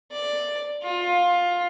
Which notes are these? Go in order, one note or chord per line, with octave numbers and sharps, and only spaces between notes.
D5
F4